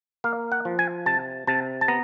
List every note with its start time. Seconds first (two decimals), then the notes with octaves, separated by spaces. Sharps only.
0.24 A#3 F5
0.52 F#5
0.65 F3
0.79 G#5
1.06 C3 A5
1.47 C3 A5
1.81 A5
1.88 B3 A#5